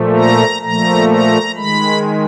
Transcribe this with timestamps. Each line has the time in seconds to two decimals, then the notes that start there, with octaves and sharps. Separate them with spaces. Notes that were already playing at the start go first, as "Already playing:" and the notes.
Already playing: A#2 F3 A3
0.16 A#5
0.63 A#2 F3 A3 A#5
1.09 A#5
1.56 D#3 G#3 B5